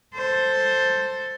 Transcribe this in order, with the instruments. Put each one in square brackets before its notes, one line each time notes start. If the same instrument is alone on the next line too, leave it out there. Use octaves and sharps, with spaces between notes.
[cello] A4 C5